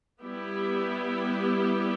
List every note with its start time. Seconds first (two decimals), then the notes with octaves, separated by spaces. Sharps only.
0.21 G3 B3 E4 G4